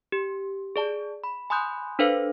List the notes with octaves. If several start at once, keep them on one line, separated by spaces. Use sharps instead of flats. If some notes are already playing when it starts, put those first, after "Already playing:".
G4
G#4 D5 A5
B5
G#5 B5 C6 D#6 F#6 G6
D4 A4 B4 C5 F5